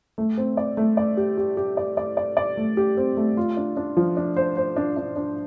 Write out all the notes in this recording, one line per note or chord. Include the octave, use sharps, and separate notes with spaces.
A3
C4
D5
A3
D5
G4
G4
G4
D5
D5
D5
D5
A3
G4
C4
A3
F4
D4
D4
F3
D4
C5
C5
D4
D4
D4